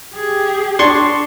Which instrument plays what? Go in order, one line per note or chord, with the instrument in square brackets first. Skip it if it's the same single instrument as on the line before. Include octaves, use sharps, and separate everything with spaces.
[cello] G4 G#4
[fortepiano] D4 [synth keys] C6 C#6